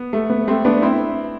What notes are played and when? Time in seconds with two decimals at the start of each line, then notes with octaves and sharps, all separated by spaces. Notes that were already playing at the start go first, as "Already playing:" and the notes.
Already playing: B3
0.13 A3
0.30 B3
0.48 A3 C4
0.65 B3 D4
0.82 C4 E4